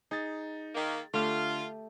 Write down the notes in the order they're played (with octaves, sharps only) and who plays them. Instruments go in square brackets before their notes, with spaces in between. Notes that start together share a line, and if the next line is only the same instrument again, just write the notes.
[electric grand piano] D#4 A6 [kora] G#4
[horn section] D#3 A#3
[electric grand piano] D3 [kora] A3 G4 [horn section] F4